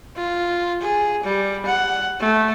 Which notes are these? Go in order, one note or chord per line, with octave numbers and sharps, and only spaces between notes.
F4
G#4
G3
F#5
A3